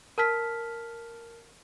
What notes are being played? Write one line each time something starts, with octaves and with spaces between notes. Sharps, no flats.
A#4 A5 F6 B6